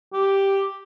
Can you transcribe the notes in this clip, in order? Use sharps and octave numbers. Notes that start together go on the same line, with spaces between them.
G4